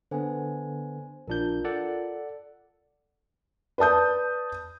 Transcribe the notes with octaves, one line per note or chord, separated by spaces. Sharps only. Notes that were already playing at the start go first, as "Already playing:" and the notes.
D3 B3 C5 G#5
A#1 D4 F4 A#4 G6
A4 D5 F#5
B4 D5 A5 D#6 G6